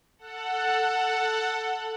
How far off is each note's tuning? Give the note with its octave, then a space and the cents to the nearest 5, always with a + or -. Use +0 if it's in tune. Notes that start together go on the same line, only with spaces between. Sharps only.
A4 +15 F#5 +0